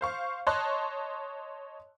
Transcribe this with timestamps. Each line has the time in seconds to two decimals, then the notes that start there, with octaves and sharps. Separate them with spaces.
0.01 C5 F5 C#6
0.47 C#5 D#5 A5 C6 C#6 F#6